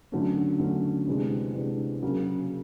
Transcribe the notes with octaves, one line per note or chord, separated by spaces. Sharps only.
D3 F#3 A3 C#4
D3 F#3 A3 C#4
C3 E3 G#3 B3 D4
C3 E3 G#3 B3 D4
C#3 F#3 A#3 C#4